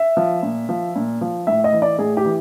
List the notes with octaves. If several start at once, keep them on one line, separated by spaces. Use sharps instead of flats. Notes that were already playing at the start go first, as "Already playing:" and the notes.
Already playing: E5
F3
A#2
F3
A#2
F3
A2 E5
D#5
E3
D5
A2 G#4
G4
E3